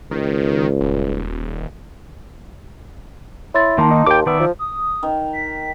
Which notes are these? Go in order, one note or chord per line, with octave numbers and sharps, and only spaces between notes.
C#2 D#3
D#1
E4 C#5 C6 A6
D#3 A#3 A5 C6
D#4
D#2 G5 D6
D#3 B3 D5 E5
F3
D#6
D#3
B6